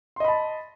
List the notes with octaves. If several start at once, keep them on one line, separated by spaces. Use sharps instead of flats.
D#5 A5 B5 C6